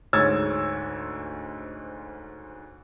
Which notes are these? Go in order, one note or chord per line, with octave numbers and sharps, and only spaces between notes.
D2 G#2 C#5 E6 G#6 A6